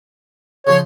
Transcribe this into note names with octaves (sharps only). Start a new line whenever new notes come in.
C#3 F3 C#5 C6